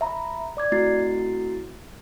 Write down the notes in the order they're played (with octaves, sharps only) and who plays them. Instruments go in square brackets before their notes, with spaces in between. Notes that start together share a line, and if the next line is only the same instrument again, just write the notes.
[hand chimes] E5 A#5 B5
D5 D6 G#6
A3 C4 E4 F#4 A6 C7